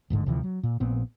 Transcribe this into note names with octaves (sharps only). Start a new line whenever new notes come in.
D1 G1 G#2 D3
D2 C3 E3 F3
F#3
A#2
A#1 A#2 B3 C4